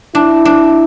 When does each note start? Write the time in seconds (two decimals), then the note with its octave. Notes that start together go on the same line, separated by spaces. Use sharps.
0.15 D4 E4
0.45 D4